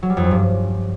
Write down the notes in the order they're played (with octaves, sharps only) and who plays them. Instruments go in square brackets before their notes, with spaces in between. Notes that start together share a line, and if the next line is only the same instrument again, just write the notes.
[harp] F#3
G3
F2
F#2
G2